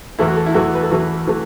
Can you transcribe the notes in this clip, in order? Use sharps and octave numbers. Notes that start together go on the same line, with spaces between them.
E2 E3 A3 E4
F#4
A4
E4
E2 E3 A3 F#4
B4
A4
E2 E3 A3 F#4
E3 A3